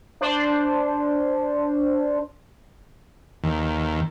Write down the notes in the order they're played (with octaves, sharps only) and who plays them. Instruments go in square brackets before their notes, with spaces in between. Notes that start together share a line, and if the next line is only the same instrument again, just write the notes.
[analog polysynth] D4 C5
[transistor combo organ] D#2